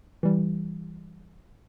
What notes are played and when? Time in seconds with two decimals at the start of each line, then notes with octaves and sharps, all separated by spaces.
0.23 E3 G3